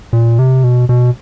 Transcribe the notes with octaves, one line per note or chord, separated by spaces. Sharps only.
A#2
C3
B2
B2